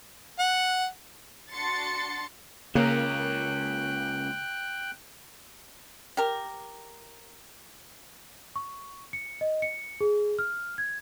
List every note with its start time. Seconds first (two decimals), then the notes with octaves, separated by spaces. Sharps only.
0.39 F#5
1.51 D4 F#4 C6 A6 C#7
2.75 C#2 C#3 A#3 C#4 A#4 G5 F#6
6.17 G4 A#4
8.56 C#6
9.13 C#7
9.41 D#5
9.62 C#7
10.01 G#4
10.39 F6
10.78 G#6